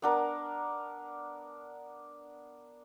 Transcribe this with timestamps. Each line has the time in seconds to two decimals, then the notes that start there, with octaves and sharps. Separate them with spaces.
0.02 B3 D4 A#4